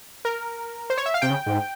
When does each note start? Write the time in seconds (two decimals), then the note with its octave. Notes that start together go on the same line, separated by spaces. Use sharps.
0.25 A#4
0.90 C5
0.97 C#5
1.06 E5
1.14 F5
1.22 C3 G5
1.30 C#3
1.46 G#2